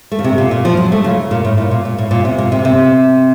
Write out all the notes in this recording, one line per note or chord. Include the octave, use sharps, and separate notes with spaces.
A3
C#3
C3
A#2
A#2
F3
F#3
A3
C#3
A#2
A2
A#2
A#2
A#2
A2
A#2
C3
A#2
C3
C3